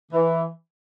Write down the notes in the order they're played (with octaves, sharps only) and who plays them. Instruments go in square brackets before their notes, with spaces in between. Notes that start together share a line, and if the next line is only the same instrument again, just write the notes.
[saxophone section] E3